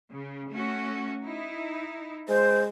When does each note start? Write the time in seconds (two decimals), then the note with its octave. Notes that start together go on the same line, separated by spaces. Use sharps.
0.11 C#3
0.50 A3 C#4 F#4
1.24 D#4 E4
2.29 G#3 C5